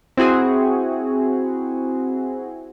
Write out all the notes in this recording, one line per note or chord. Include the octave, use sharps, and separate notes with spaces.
C4 E4 F#4 G#4